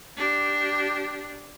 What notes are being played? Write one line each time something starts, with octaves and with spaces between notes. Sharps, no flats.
D4 G4